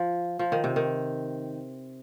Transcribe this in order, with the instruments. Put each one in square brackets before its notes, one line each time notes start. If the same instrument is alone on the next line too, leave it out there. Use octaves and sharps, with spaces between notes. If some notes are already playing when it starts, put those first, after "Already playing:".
Already playing: [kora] F3
F3
D#3
C3
D#3